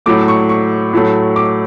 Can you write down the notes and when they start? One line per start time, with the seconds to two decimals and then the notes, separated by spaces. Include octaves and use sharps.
0.06 A2 F#3 A3 D6
0.28 C#6
0.49 C#6
0.93 A2 F#3 A3
1.36 D6